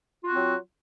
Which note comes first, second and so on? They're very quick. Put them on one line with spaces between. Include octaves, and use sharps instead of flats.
F4 F#4 C4 F#3